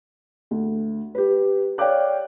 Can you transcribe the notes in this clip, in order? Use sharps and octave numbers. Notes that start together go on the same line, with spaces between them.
D2
G4 B4
C#5 D5 F5 G5 D6 F#6